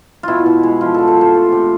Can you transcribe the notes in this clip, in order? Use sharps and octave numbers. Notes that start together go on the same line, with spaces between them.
B2 E4 F4
B2
G#3
F3 F4
D3 A4
A4
F3 C5
A3
C3